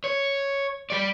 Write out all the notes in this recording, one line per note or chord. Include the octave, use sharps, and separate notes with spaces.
C#5
G3 D5